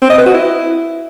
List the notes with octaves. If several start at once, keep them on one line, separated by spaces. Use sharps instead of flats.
C4
D#5
B4
F#4
E4